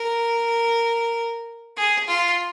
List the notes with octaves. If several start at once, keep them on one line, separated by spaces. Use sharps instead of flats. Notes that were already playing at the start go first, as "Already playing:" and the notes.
Already playing: A#4
G#4
F4